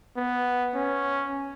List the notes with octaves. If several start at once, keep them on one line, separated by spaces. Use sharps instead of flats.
B3
C#4